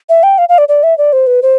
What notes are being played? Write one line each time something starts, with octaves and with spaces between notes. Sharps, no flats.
E5
G5
F5
F5
D5
D5
E5
D5
C5
B4
C5